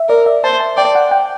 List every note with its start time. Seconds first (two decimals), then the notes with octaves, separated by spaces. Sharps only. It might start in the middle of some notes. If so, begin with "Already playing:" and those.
Already playing: E5
0.09 A#4 D5
0.26 E5
0.44 C5 A5
0.60 A5
0.77 D5 G5
0.95 F#5
1.11 G5